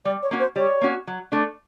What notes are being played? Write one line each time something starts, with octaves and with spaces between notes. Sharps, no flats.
G3 D5
C#5
A#3 C#4 F#4
C5
G3 C#5
A#3 C#4 F#4
F#3
A3 D4